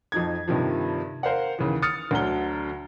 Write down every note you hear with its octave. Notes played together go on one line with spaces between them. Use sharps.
F2 F3 D#4 G#6
G2 C3 D#3 F3
A#4 C5 F5 F#5
D#2 C#3 E3
D#6 F6 A6 C#7
D2 D3 F#3 A#5 G7